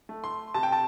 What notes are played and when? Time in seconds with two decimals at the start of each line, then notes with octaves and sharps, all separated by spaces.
0.09 A3
0.24 C6
0.54 C3 A5
0.63 G5
0.72 A5